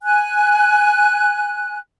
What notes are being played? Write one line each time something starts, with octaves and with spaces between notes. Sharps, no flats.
G#5 F#6